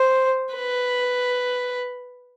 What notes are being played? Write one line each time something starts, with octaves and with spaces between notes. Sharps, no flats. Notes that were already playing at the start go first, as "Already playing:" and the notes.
Already playing: C5
B4